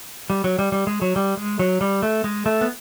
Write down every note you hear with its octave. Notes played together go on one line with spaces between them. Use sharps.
G3
F#3
G3
G3
G#3
F#3
G3
G#3
F#3
G3
A3
G#3
A3
B3